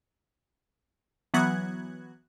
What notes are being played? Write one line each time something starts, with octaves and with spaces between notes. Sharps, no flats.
E3 F#3 B3 F#4 F#6 G#6